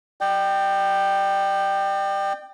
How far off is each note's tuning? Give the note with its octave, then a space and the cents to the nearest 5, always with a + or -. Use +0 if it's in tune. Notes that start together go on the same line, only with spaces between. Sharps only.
D5 +40 G5 +0